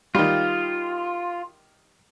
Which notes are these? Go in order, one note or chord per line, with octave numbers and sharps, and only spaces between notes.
D#3 G3 F4